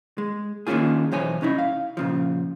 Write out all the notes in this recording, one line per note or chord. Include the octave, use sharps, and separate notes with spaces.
G#3
D#3 A#3 C#4 D4 F4 G#4
B1 E3 C5 C#5 G#5
C2 C#4 D#4 E4
F5
A#2 C#3 F3